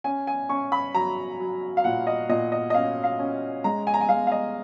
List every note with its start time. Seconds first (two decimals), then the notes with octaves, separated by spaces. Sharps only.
0.04 C#4 G#5
0.27 G#5
0.49 C#4 C#6
0.72 B5
0.94 F#3 A#5
1.40 F#3
1.77 F5
1.84 A#2 F#5
2.07 D#5
2.29 A#2 D#5
2.52 D#5
2.70 D#5
2.74 C#4 F5
3.04 F5
3.19 C#4
3.64 G#3 A#5
3.87 G#5
3.94 A#5
4.01 G#5
4.09 G#3 F5
4.27 F5
4.32 D#5